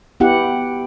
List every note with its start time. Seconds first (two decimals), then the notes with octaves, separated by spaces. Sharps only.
0.20 B3 E4 G4 F#5